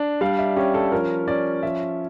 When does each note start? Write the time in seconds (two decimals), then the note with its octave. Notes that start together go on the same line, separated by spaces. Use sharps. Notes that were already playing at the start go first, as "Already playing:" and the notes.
Already playing: D4
0.21 G3 F5
0.39 E5
0.57 C#4 G4
0.74 A4
0.92 F3 A#4
1.27 C#4 D5
1.63 F3 E5